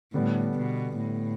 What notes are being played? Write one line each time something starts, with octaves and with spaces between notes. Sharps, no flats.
A2 D3 G3 B3 D4
B2
A2